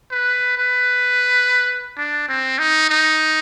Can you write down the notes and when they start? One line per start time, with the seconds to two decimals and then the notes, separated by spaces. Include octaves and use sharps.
0.11 B4
0.57 B4
1.97 D4
2.29 C4
2.59 D#4
2.90 D#4